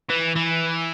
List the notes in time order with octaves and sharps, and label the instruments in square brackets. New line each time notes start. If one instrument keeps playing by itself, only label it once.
[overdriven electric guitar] E3
E3